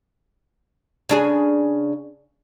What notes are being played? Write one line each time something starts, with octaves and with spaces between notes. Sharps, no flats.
C#3 D4 G#4